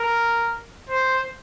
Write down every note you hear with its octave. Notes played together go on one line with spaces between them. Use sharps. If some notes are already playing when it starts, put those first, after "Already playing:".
Already playing: A#4
C5